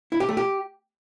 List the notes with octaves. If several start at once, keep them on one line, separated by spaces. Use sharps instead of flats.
E4
G4
A3
G4